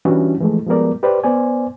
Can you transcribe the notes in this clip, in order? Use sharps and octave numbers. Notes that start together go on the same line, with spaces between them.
E3 G3 C#4 D4 E4 F#4
E3 F3 G#3 A3
F3 G3 G#3 B3 A#4 D5
G4 B4 C5 D5
B3 C5 D5 G#5